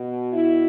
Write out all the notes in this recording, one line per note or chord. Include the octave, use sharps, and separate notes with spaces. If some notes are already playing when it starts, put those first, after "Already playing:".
Already playing: B2
E4